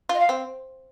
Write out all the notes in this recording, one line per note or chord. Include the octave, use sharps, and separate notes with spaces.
F4 D#5
F5
C4